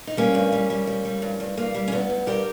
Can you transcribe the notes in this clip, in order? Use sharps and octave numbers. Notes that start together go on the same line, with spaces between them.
D#4
G3 A#3 C#4
G2
G3
G3
G3
G3
G2
G2
G2 A#3
G3
C#4
G2 B3
G2
G2 G4 A#4